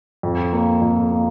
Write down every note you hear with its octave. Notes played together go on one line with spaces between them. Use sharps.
F2
A#3
F2
A#3